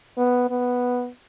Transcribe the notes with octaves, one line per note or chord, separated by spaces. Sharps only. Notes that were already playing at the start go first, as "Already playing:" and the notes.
B3
B3